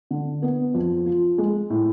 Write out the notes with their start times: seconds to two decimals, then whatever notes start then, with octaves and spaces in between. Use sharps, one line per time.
0.11 D3
0.42 B3
0.74 F2
1.06 F3
1.38 G#3
1.70 A2